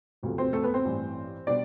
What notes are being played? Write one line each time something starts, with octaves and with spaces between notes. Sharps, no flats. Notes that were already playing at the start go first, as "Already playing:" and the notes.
E1 D2 C3 F3 A3
C4 C5
A3 A4
B3 B4
C4 C5
A1 G2 E3
B2 G3 D4 D5